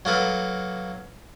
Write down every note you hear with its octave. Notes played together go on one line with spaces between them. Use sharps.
F#3 A#3 A4 B4